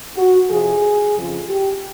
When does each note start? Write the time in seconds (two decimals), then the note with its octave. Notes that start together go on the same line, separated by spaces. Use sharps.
0.16 F#4
0.50 F2 C3 F3 G#4
1.15 F2 C#3 F3
1.47 G4